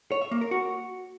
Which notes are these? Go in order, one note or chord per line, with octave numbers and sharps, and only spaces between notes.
C#5
E5
A#3
A#4
F#4